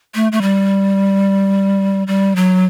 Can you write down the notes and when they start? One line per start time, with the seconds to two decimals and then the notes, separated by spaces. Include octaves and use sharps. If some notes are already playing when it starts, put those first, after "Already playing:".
0.15 A3
0.32 A3
0.42 G3
2.07 G3
2.36 F#3